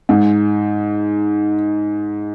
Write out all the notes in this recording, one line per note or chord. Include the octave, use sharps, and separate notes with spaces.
G#2